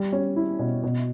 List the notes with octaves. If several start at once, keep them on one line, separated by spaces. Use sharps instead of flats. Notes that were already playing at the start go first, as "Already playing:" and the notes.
Already playing: G3
C#4
E4
B2
B2